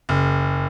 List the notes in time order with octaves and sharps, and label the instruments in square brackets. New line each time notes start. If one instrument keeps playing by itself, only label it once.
[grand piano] F#1